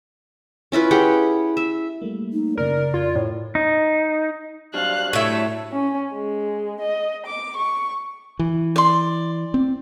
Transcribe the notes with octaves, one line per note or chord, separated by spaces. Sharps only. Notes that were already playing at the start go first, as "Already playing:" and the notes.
C#4 E4 F4 B4
G4 G#4 F#5 G5
E5
G3 A3 A#3
D#4
F#2 C#3 A#4 D5
F2 F4 G#6
A2
D#4
F#3 G3 D4 C5 F5 F#6
A2 A3 C#5 E5
C#4
G#3
D#5
D6
C#6
E3
D5 C6
C4